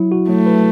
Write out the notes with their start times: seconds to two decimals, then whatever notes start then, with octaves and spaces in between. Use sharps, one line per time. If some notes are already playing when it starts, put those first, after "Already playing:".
Already playing: F#3 E4
0.12 F#4
0.29 F#3 A3
0.46 B4